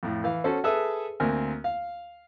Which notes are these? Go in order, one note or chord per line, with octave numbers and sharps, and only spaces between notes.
F2 A2
E3 F5
C#4 F#4 A4 C5
G#4 A4 B4 E5 E6
D2 A#3 C4 A#4 G#5
F5